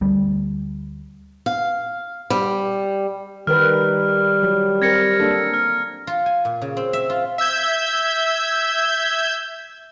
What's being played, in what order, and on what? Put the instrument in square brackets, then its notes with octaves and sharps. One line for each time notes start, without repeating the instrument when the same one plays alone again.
[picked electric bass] D2 G3
[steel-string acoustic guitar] F5
G3
[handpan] D#3 A#4 B4 [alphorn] G3 [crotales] F6
[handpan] F#3
[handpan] C4 A#4 [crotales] G#6 A#6 C#7
[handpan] A#3 D4 A4
[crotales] F6
[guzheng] F4
G#5
A#2
C#3
C4
E5
F4
[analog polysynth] E5 E6 G6 G#6